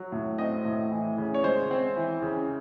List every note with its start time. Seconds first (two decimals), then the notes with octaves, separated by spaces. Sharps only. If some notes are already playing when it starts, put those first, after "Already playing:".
Already playing: F#3
0.12 A2
0.38 C4 D#5
0.65 A2
0.91 E3
1.18 C#3
1.34 C#5
1.44 G#3 C5
1.71 C4
1.96 E3
2.22 C#3